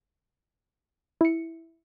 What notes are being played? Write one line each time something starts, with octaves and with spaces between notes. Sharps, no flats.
E4 C#7